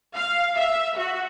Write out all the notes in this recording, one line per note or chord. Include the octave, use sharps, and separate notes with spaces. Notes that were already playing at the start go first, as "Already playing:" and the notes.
F5
E5
F#4